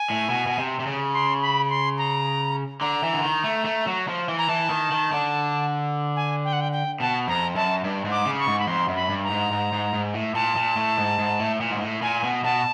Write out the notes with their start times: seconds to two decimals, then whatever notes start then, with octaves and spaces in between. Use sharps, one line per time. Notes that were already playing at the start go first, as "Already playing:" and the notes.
Already playing: G#5
0.10 A2
0.30 B2
0.47 B2
0.58 C3
0.80 C3
0.86 C#3
1.14 C6
1.42 B5
1.70 C6
1.98 A#5
2.81 D3 A#5
3.03 E3
3.14 D3
3.23 D#3
3.44 A3
3.65 A3
3.87 F#3
4.08 F3
4.29 E3
4.39 A#5
4.49 E3 A5
4.70 D#3
4.91 D#3
5.12 D3
6.16 G#5
6.44 G5
6.53 F#5
6.61 G5
6.72 G5
7.00 B2 A5
7.27 F2 A#5
7.56 F#2 A5
7.84 G2
8.05 G#2
8.12 D6
8.26 C#3
8.39 C#6
8.47 G#2
8.60 B5
8.67 F2 C6
8.88 F#2
8.95 B5
9.10 G2
9.24 A#5
9.30 G#2
9.52 G#2
9.73 G#2
9.94 G#2
10.14 A2
10.35 A#2 A5
10.56 A#2
10.77 A2
10.97 G#2
11.19 G#2
11.39 A2
11.60 A#2
11.71 G#2
11.81 A2
12.02 A#2 G#5
12.24 B2
12.44 B2 A5